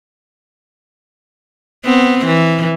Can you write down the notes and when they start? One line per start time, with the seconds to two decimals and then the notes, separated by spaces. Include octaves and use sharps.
1.85 B3 C4
2.26 E3